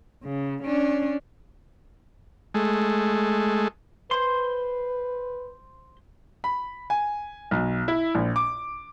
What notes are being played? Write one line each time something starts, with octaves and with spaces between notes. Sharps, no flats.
C#3
C#4 D4
G#3 A3
B4 C5 C6
B5
G#5
B1
E4
A#1
D6